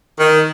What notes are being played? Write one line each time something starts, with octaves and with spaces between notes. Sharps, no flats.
D#3